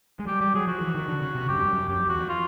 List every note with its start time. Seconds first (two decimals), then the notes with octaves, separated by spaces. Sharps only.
0.19 G#3
0.27 G3 G4
0.41 G3 G4
0.54 F#3 G#4
0.67 F3 F#4
0.81 E3
0.95 D#3
1.08 D3
1.22 C#3
1.35 C3
1.49 F#2 G4
1.57 G2
1.66 F#2
1.88 F#2 G4
1.99 F2
2.09 E2 F#4
2.20 F2
2.29 F4